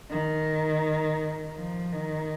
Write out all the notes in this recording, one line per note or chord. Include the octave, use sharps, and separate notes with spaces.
D#3
F3
D#3